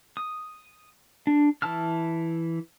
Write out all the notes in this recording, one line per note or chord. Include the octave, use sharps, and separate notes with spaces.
D#6
D4
E3 E4 A5 E6 F6